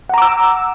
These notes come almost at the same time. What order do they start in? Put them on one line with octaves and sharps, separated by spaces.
F#5 A#5 D6 E6